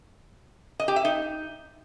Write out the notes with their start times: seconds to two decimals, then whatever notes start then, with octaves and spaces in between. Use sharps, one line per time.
0.80 D#5
0.88 G4
0.96 E5
1.05 D#4